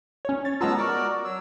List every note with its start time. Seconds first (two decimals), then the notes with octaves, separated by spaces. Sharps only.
0.25 C#4 C#5
0.45 C#5 A6
0.61 G#3 B3 F4 A5 A#5 E6
0.79 F#4 A#4 D5 C#6
1.25 F#3 E6